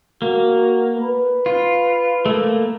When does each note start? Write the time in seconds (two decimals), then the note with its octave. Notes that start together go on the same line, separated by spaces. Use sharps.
0.22 A#3 F#4
0.94 B4
1.46 F4
2.26 A3 A#3